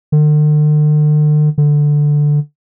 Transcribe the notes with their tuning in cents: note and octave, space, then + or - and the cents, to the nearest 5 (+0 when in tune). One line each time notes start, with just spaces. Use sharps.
D3 +45
D3 +5